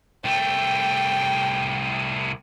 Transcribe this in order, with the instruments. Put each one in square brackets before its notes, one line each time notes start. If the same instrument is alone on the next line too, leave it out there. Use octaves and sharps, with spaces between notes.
[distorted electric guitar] C2 A3 [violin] G5